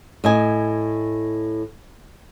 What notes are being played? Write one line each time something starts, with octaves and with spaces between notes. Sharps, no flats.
A2 D#5 G#5